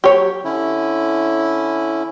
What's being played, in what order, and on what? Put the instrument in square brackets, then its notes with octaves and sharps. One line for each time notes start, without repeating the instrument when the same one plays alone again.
[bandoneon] F#3 [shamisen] G4 C#5
[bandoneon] D3 C#4 E4